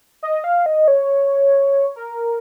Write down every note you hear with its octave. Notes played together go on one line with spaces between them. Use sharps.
D#5
F5
D#5
C#5
A#4